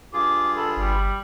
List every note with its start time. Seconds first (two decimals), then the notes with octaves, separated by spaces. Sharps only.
0.13 G2 F4 G#4 D6
0.56 A4 B5
0.77 G1 G3